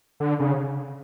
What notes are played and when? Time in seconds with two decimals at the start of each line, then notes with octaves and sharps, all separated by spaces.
0.20 D3
0.40 C#3